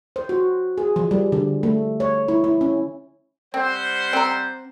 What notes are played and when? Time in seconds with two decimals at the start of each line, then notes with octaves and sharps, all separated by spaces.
0.16 C5
0.29 F#4
0.78 G#4
0.96 F3
1.11 G3
1.32 D3
1.63 A3
2.00 C#5
2.28 E4
2.44 E4
2.61 C#4
3.54 G3 C4 C5 F#5
4.13 C4 A#5